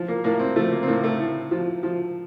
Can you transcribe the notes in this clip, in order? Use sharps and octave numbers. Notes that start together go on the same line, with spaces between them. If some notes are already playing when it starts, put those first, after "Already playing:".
Already playing: F3
A#3
A2 A#3
C4
F3 A3
A#3
C4
A2 A#3
A3
A2
F3
F3